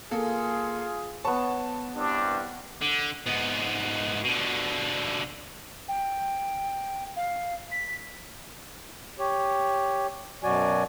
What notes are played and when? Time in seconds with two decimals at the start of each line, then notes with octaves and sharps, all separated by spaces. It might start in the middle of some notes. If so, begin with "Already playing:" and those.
0.11 A#3 F4 G#4 A4
1.25 B3 C#5 A5
1.96 C2 G2 D4
2.82 D3
3.26 G#2 B3
4.24 B2 D3
5.88 G5
7.16 F5
7.72 B6
9.19 G4 C#5
10.43 F#2 B2 F#3 F#4 D5 G#5